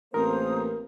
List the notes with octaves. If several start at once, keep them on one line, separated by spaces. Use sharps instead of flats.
A1 A#3 C4 A#4 C5 A#5 D#6